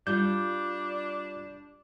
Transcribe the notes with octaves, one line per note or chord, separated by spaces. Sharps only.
G3 D4 F4 G6